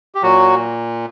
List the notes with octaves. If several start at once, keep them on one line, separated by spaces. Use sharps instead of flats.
G4
A#2 F#3 F#4